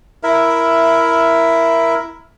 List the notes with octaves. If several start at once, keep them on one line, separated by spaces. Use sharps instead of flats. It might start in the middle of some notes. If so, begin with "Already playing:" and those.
E4 A#4 E5